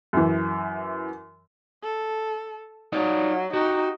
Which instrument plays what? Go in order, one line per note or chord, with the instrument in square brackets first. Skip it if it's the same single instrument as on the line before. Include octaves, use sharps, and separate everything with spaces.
[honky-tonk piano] F#2 E3
[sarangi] A4
[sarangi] F#3 [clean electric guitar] D#4 F4 D5
[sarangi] D#4 [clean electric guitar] F#4 G4